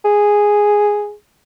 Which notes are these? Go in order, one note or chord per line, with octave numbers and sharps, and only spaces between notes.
G#4